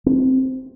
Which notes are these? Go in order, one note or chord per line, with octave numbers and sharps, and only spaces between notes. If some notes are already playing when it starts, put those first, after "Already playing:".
C4